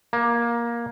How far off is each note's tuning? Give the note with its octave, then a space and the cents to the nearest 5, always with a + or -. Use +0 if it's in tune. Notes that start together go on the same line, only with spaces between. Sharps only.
A#3 +15